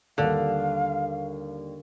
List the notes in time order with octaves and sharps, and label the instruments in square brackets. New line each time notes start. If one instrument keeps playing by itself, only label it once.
[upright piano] D#2 G3 [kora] D3 [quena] F5